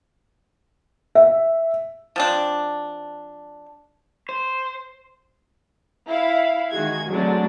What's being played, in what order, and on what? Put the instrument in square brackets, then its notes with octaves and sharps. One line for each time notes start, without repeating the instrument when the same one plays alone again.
[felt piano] E5
[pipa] F3 C4 D4
[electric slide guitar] C5
[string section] E4 F5
D#3 G#3 F#4 G#4 G#6
D3 F#3 G#3 A3 C4 D4